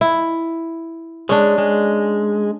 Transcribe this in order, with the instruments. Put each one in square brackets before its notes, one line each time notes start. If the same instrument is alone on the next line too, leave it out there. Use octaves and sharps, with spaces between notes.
[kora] E4
[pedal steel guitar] G#3 [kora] C#4 D4
[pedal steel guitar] G#3